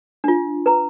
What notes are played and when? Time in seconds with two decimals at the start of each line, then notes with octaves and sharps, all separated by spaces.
0.24 D4 F4
0.66 B4 A#5